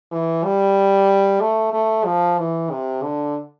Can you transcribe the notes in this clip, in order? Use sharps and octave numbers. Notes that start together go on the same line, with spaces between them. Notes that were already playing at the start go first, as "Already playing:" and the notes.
E3
G3
A3
A3
F3
E3
C3
D3